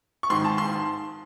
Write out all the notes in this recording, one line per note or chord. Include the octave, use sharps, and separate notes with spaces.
C#6
G#2 D#3 C6
A5
C6